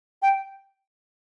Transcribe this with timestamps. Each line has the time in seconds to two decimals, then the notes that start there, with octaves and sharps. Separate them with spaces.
0.22 G5